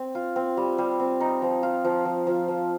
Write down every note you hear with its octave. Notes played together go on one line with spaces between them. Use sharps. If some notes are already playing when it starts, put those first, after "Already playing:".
Already playing: C4
F4
C4
G3
G3
C4
D#4
F3
F4
F3
F3
F3
F3